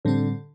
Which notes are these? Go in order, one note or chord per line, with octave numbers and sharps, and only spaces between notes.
A2 D3 G3 C4 A4